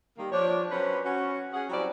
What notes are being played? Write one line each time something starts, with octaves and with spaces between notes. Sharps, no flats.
D#3 G3 A#3
F3 D4 C#5
F#3 B3 C#4 B4 C5
C#4 F#4
C#4 G#4 F#5
F#3 G3 C4 C#4 E4 D5